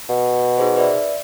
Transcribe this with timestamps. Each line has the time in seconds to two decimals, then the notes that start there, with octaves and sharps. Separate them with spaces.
0.10 B2
0.58 D#4 G#4 C5
0.76 B4 D5 E5